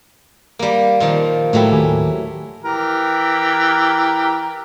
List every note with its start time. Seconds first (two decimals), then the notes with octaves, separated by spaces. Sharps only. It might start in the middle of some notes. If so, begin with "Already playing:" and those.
0.59 G3 A#3
1.00 A#2 D#3 F3
1.53 A2 F#3 A3 E4 G5
1.72 D#2 G4 G#5
2.64 E3 G4 A#4